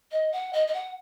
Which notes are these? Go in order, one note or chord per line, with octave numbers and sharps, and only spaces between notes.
D#5
F#5
D#5
D#5
F#5